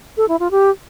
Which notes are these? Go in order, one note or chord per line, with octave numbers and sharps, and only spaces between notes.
A4
E4
F4
G4